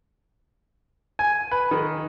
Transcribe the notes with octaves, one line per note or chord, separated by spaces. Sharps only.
G#5
B4
D#3